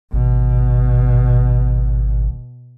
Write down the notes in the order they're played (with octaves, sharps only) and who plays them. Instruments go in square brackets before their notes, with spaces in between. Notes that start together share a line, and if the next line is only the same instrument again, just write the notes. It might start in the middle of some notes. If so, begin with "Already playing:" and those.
[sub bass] G#1 [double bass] B2